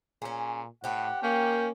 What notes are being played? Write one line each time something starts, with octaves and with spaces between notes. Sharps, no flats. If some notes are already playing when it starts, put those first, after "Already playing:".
A#2 C#4 G#4
A2 C4 G4 F#5
A#3 C#4 G5